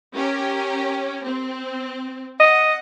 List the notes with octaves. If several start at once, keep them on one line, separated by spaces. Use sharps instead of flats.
C#4 G4 A#4
C4
D#5 F#5